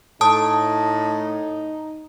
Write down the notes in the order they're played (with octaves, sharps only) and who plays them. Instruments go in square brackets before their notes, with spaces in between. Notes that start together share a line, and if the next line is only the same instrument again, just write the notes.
[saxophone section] A2 [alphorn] D#4 [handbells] A5 D#6